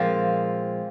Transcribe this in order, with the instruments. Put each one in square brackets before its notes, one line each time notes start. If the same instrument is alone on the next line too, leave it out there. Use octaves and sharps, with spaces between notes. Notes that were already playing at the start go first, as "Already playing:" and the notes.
Already playing: [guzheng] A#2 F3 G#3 C4 F4